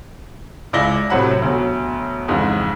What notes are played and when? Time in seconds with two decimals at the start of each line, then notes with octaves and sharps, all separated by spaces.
0.73 C#2 E4 D5 A#6 G7
1.10 A2 C3 F#3 C5 F#5 B5
1.42 D2 B2 F#3
2.28 F2 G#2 C#3 E3